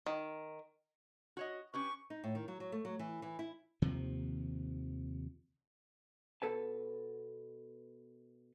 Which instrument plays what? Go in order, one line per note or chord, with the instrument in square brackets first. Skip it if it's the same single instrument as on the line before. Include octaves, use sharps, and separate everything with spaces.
[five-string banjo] D#3
[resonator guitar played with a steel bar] F#4 C#5 D#5
[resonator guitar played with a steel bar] C#4 G4 B4 [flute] C#6
[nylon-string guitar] D#4
A2
D#3
F#3
F#3
A3
F#3
E3
E3
E4
[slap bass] D#2 C3 D#3 F3
[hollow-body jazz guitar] B2 A4 B4 A5